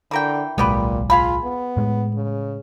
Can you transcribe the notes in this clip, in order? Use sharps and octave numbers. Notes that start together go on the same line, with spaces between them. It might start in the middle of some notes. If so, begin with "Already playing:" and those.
D3 E3 A#4 G5
D1 B1 A#2 G#3 B3 G4 B4
F4 G#4 F5 B5
B3
A2 G#3
C#3